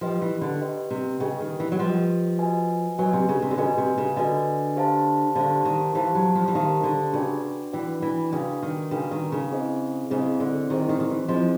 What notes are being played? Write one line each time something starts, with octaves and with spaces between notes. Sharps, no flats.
F3 G4 B4 D#5 G5
E3
D3
G4 B4 D#5 G5
C3
C#3 G4 B4 D#5 G5
D#3
E3
F#3
F3 G4 B4 D#5 G5
F#4 B4 D#5 G#5
F#3 F#4 B4 D#5 G#5
C3
C#3
C3
D3
C#3 F#4 B4 D#5 G#5
C3
C#3
D3 F#4 B4 D#5 G#5
G4 C5 F5 A5
D3 G4 C5 F5 A5
D#3
E3 G4 C5 F5 A5
F#3
F3
E3
D#3 G4 C5 F5 A5
D3
C#3 D4 F#4 B4 D5 G5
E3 D4 F#4 B4 D5 G5
E3
C#3 D4 F#4 B4 D5 G5
D#3
C#3 D4 F#4 B4 D5 G5
D#3
C#3
C4 E4 G#4 C5 D#5
C#3 C4 E4 G#4 C5 D#5
D3
D#3 C4 E4 G#4 C5 D#5
D#3
D#3
E3
F3 C4 E4 G#4 C5 D#5